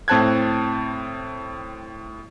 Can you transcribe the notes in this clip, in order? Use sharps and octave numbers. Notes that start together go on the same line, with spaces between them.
A2 C4 C5 A5 F#6 G#6